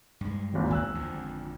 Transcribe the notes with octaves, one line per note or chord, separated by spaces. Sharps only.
G2 G#3
D#1 G#1 D#2
G#1 D#2 B3 G#5 E6 F#6
G#1 F2 D3